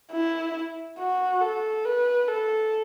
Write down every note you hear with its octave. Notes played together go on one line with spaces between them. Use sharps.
E4
F#4
A4
B4
A4